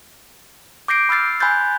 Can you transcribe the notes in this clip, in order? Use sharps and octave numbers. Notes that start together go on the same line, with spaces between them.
D6 G6 A#6 C7 D7
B5 E6 F6 A6 C7
G#5 B5 C6 F#6 G6 A6